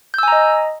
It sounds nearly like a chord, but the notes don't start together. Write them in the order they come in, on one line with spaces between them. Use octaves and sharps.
G6 E6 G#5 A#5 D#5